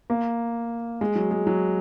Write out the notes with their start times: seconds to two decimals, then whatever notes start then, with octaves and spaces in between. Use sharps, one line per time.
0.10 A#3
1.01 G#3
1.15 F#3
1.31 G#3
1.47 F#3